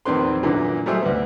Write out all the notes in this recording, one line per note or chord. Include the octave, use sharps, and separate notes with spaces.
A#1 E2 D#3 C4 B4 C6
F#2 A#2 D3 E3 B3
F#3 G3 A3 G#4 C5 E5
D2 B3